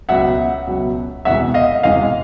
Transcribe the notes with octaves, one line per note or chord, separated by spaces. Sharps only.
C#2 B2 F#3 E5 F#5
C#2 B2 F#3
E1 E2 C3 E3 G#3 E5 F#5
D#5 F5
E1 E2 C3 E3 G#3 D#5 F5